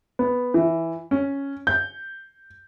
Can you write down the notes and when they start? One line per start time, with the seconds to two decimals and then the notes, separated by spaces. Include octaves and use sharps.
0.19 B3
0.54 E3
1.11 C#4
1.67 G6